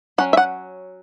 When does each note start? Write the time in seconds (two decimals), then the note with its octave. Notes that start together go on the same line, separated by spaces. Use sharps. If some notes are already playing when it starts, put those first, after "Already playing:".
0.18 F#3 C#4 F#5
0.33 E5
0.37 F#5